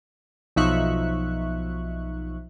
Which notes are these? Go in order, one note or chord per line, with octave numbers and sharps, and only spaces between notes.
B1 F3 D#4 E5 C#6 F#6